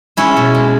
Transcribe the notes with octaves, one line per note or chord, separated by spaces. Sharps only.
G#3 C#4 E4
B2
G#3